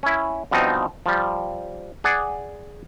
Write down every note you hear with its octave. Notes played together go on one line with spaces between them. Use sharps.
C#4 E4
G2 B2 F3 C4 D#4
F3 G3
G#4 D5 F#5